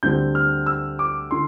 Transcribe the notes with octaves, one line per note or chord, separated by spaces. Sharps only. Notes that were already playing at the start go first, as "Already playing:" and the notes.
D2 D3 G3 C4 G6
F6
E6
D6
D3 C6